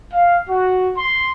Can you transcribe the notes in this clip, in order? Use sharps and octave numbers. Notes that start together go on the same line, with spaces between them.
F5
F#4
C6